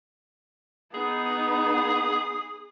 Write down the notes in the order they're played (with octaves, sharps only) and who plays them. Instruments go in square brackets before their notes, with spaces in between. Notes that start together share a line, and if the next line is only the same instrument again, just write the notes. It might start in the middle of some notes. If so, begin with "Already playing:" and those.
[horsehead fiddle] B3 D#4 [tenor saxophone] G#4